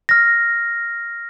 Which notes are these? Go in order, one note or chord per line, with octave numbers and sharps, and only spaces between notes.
F6 A#6